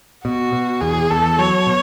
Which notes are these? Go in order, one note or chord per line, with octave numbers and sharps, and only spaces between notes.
B2 F#4
B2
E2 G#4
E2 A4
F#3 C#5
B2